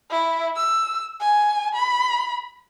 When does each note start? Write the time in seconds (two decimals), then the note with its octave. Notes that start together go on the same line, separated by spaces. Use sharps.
0.11 E4
0.57 E6
1.20 G#5
1.75 B5